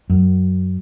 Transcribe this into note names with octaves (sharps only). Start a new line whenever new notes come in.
F#2